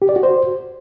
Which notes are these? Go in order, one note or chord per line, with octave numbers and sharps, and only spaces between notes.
G4
D5
F#4
C5